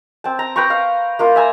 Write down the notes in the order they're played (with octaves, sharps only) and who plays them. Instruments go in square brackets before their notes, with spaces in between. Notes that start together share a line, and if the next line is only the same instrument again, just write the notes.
[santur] C4 A5
A#5
B4 G5 A#5 C#6
F5
A#3 F4 A#4
E5 G#5 A#5